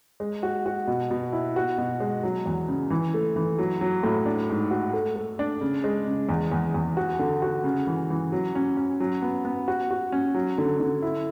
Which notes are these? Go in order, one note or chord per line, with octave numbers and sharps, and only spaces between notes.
G#3
F#4
F#4
B2
B2
E4
F#4
B2
G#3
F#3
E2
C#3
E3
A3
E3
F#3
F#3
A2
D4
G#2
F#4
A3
A3
D4
C#3
G#3
C#3
E2
E2
E2
F#4
D3
F#4
C#3
E3
E3
F#3
C#4
C#4
F#3
B3
B3
F#4
F#4
C#4
F#3
D3
D3
E4